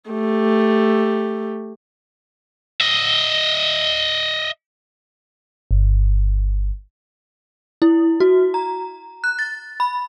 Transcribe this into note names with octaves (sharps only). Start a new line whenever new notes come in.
A3 G4
D#5 E5
G1
E4
F#4
A#5
F#6
A6
B5